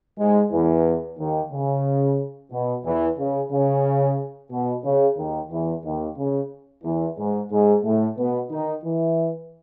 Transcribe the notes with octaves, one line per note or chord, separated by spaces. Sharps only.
G#2 G#3
E2 E3
D#2 D#3
C#3
B2
E2 E3
C#3
C#3
B2
C#3
D#2 D#3
E2 E3
D#2 D#3
C#3
E2 E3
G#2 G#3
G#2 G#3
A2 A3
B2 B3
D#3 D#4
E3 E4